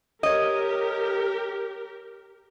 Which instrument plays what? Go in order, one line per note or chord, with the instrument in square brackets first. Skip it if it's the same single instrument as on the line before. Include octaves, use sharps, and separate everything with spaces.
[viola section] G4 A#4 [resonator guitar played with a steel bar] C#5 D#5